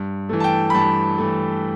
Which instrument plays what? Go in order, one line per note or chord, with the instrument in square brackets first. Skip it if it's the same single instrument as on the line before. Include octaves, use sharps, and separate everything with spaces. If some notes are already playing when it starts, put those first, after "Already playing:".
Already playing: [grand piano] G2
E3 A3
A5
G5
B5
G2 A5
E3 A3